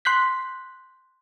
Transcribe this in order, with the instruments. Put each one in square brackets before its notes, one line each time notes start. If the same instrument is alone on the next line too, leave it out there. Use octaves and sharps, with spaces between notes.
[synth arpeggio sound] C6 F#6 G6 B6